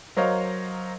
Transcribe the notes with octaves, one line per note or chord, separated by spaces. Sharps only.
F#3 A#4 C5 C#5 D#5 F5